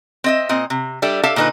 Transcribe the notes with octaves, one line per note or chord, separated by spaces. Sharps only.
C4 D#5 E5
A#2 C4 D#5
C3
G3 D4 A4 E5
G4 A4 E5 F5 A5
A#2 D3 D#4 F4 B4